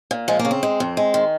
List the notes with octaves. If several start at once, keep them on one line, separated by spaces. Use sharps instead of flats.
A#2
F3 G#3
A#3
C#3
C4
G#3
F2
G#3
D#3